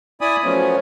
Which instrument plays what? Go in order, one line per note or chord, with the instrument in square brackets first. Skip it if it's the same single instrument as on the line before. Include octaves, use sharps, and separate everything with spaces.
[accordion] E4 D5 G#5 B5 D#6
F3 F#3 A3 B3 C#4